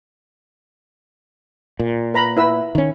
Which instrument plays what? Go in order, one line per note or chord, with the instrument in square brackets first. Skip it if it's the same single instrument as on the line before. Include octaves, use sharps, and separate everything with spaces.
[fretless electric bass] A#2
[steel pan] B4 A#5 B5
E4 B4 E6
[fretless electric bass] D#3 C#4